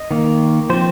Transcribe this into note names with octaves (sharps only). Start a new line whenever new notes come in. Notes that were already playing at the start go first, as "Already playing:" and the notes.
Already playing: D#5
D#3 A#3
F3 C4 C5